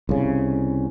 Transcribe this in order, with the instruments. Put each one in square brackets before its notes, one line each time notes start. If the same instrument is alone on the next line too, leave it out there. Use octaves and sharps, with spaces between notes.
[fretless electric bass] C2 C#3